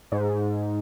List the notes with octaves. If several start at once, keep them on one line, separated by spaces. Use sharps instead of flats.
G#2